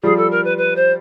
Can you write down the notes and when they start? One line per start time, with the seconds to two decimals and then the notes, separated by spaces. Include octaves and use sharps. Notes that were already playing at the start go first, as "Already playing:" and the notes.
0.03 F3 G3 G#4
0.17 A4
0.31 A#4
0.44 B4
0.58 B4
0.76 C5